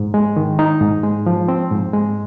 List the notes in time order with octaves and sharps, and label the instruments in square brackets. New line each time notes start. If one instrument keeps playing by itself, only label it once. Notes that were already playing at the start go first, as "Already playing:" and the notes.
Already playing: [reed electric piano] G#2
G#3
D#3
D#4
G#2
G#3
F3
C4
G#2
G#3